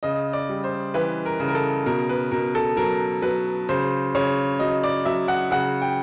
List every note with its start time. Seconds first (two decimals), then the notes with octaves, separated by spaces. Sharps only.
0.03 C#3 D#5
0.33 D5
0.49 G3
0.64 C5
0.94 E3 B4
1.26 A#4
1.40 C#3
1.48 A#4
1.55 A4
1.86 B2 A#4
2.09 B4
2.31 B2 A#4
2.55 A4
2.77 F#3 A#4
3.22 F#3 B4
3.69 C#3 C5
4.15 C#3 C#5
4.59 F#3 D#5
4.83 D5
5.05 F#3 E5
5.28 F#5
5.51 C#3 F#5
5.82 G5